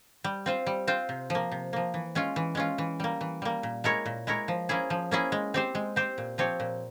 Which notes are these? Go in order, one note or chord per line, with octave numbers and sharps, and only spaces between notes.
G3
C4 F4 C5
G3
C4 F4 C5
C3
F3 A#3
C3
F3 A#3
E3
G#3 C#4 F4
E3
G#3 C#4 F4
E3
G3 A#3
E3
G3 A#3
A#2
G#3 E4 A#4 C#5
A#2
G#3 E4 A#4 C#5
F3
A#3 C#4 E4 G#4
F3
A#3 C#4 E4 G#4
G#3
C4 G4 C5
G#3
C4 G4 C5
A#2
F3 C4 G4 C#5
A#2